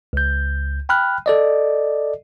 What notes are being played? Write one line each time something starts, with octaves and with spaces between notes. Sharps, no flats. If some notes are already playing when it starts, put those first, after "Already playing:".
C#2 G6
G5 B5 F6 F#6
A4 D5 D#5